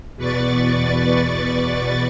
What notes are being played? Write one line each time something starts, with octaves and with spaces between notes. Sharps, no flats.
E2 B2 B4 D5 C#6 A6